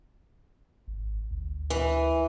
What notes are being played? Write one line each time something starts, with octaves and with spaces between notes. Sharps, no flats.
G#1
D2
E3